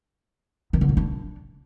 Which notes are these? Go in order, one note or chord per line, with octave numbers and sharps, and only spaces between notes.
D#3
D3
A#2
D4